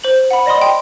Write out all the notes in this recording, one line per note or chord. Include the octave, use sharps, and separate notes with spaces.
C5 F#7
F#5 B5
D5 D#5 B5 C6 D#6
G5 C6